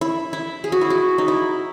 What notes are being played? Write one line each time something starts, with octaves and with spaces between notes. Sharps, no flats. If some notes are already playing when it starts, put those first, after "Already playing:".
E4
E4
G#4
F#4
E4
F#4
D#4
E4